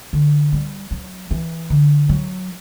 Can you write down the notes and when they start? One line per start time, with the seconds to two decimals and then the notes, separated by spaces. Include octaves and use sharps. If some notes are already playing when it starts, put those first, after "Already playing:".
0.13 D3
0.52 G3
0.91 F#3
1.31 E3
1.70 D3
2.09 F#3